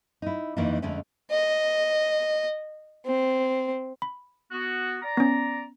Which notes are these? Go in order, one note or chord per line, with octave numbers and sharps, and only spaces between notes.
D#4 E4
F2 D#3 E3 A#3 D4 D#4
F2 D3 G#3 A3 C#4
D#5
C4
B5
B3 F#4
D5 A#5
B3 C#4